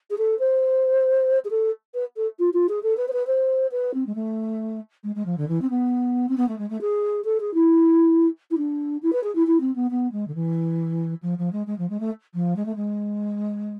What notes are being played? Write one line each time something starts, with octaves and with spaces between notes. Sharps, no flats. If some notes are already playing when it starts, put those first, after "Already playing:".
G#4
A4
C5
G#4
A4
B4
A4
F4
F4
G#4
A4
B4
C5
B4
C5
B4
C4
G#3
A3
G#3
G#3
F3
D3
E3
C4
B3
C4
B3
A3
G#3
A3
G#4
A4
G#4
E4
E4
D4
E4
B4
G#4
E4
E4
C4
B3
B3
G#3
D3
E3
F3
F3
G#3
G#3
F3
G#3
A3
F3
G#3
A3
G#3